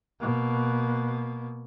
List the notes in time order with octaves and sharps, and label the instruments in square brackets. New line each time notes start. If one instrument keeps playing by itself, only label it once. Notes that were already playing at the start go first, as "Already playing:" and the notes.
[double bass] B2 A#3